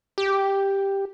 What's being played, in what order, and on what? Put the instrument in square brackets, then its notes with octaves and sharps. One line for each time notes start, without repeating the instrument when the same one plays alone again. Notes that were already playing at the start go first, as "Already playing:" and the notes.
[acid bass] G4